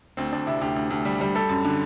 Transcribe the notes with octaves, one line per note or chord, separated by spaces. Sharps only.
D2 C4
D2 D4
C3 E4
D2 G4
D2
D2
G3
G3
G3 A4
F#2
D3